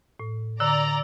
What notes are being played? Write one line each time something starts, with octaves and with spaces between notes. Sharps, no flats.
A2
D3 D5 A#5 E6